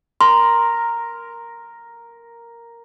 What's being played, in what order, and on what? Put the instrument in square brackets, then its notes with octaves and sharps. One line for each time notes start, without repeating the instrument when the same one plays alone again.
[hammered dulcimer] A#4 [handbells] C6